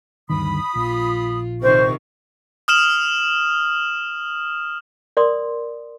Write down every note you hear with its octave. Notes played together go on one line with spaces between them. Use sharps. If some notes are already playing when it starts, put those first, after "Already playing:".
D2 G2 D#3 B5 D#6
A#1 F4
C2 C3 D#3 A#4 C5 C#6
D#6 F6 E7 F#7
A#4 D5 C6 D#6